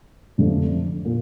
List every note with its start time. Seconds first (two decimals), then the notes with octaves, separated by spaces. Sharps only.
0.38 F2 D3 F3 A3 D4
1.05 A#2